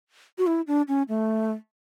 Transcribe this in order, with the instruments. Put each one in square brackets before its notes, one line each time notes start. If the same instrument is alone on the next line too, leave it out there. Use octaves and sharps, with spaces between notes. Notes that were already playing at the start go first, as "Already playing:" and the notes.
[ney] F#4
E4
D4
C#4
A3